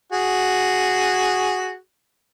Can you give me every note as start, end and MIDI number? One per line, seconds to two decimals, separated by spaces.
0.12 1.75 66
0.12 1.75 68